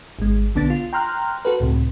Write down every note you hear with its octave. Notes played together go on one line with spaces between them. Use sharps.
G#1 G#3
B1 D3 B3 D4 A6
F4
G5 A#5 C6 F6 F#6
F#4 A4 B4
C#2 A2 C3